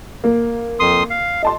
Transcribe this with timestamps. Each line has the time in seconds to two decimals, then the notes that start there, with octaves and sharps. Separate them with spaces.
0.24 A#3
0.80 F2 C6 D#6
1.10 F5
1.43 D#5 A5 C6